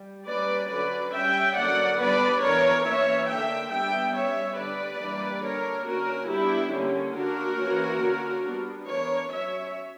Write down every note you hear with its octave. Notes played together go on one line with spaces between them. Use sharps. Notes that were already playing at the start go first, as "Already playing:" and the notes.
Already playing: G3
G3 A#3 C#4 B4 D5
D3 F#3 C#4 B4 D5
G3 C#4 E5 G5
D3 F#3 A#3 C#4 D5 F#5
G3 B3 D4 B4 D5
E3 B3 D4 A#4 C#5
E3 A#3 C#4 C#5 E5
D3 A#3 D4 E5 G5
G3 B3 D4 E5 G5
G3 C#4 C#5 E5
D3 G3 B3 D4 B4 D5
E3 G3 A#3 D4
D3 A#3 D4 A#4 C#5
D3 A#3 C#4 F#4 A#4
G3 B3 D4 E4 G4
D3 G3 A#3 C#4
D3 A#3 D4 F#4 A#4
E3 A#3 C#4
D3 A#3 C#4
G3 B3 D4
E3 B3 D4 A#4 C#5
F#3 C#4 C#5 E5